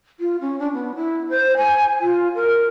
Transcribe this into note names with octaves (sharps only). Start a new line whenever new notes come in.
F4
C#4
D4
B3
E4
C5
G#5
F4
A#4